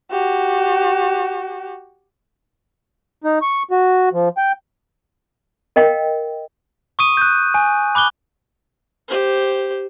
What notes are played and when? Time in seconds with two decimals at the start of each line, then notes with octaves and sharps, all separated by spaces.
0.11 F#4 G4
3.24 D#4
3.42 C#6
3.71 F#4
4.13 F3
4.38 G5
5.76 A#4 D#5 F5 G5
6.99 C#6 D#6 D#7
7.17 F#6 G6
7.54 G#5
7.95 B5 D6 F#6 G7
9.09 G4 C5